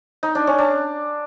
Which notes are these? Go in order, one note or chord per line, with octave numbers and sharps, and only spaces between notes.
D#4
D4
C#4
D4